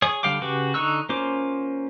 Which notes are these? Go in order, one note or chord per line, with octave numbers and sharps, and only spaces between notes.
G#4 C#5 D#6
D3 G3 F5 G5 D6
C#3 F#4 G4 B4 D6
D3 D#4 C#6 E6 F#6
A#3 C#4 F4 C5 D6